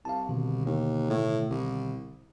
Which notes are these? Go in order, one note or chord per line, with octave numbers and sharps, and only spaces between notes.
C2 F5 A5
B2 D3 D#3
D#2
A2
C2